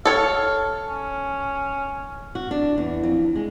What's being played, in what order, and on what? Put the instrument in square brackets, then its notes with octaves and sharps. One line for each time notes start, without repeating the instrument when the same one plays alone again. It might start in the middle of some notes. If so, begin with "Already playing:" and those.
[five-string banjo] A4 C#5 [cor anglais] F5
[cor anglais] C#4
[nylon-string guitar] F#4
D4
E2
F2
G#3